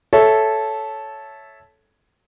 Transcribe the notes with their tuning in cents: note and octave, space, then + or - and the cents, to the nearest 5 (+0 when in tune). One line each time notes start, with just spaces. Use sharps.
A4 -10 C#5 +0 E5 +0